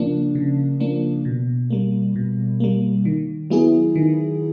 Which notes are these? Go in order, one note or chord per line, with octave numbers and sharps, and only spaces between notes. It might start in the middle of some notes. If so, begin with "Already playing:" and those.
Already playing: C#3 F3 A#3 D4
C#3
F3 A#3 D4
B2
G3 A#3
B2
G3 A#3
D#3
F#3 B3 E4 G#4
D#3